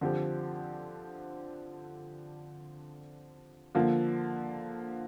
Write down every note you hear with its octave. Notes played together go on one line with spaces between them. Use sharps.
D3 F3 C4 G4
D3 F3 A#3 F4